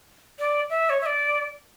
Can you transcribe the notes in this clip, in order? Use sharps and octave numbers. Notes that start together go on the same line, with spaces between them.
D5
E5
C#5
E5
D5